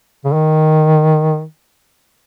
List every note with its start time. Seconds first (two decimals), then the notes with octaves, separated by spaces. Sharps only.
0.24 C#3
0.33 D#3